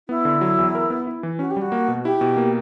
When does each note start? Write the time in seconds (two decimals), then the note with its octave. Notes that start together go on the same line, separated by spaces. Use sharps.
0.09 B3 E4
0.25 D3
0.41 F#3
0.59 E2
0.75 A#4
0.90 B3
1.07 E4
1.23 E3
1.39 C#4 F#4
1.50 G4
1.56 G3
1.61 F#4
1.72 A#3
1.88 B2
2.05 E4 G4
2.21 B2
2.37 A#3